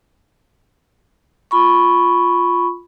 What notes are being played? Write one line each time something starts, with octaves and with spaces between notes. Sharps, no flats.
F4 B5 C#6